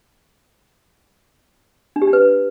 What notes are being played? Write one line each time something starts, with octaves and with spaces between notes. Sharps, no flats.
D4
G4
D4
B4